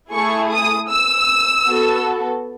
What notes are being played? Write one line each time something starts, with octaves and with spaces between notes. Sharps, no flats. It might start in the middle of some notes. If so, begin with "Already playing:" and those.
A3 E4 G#4 C#6
D#6
E6
B3 F#4 A4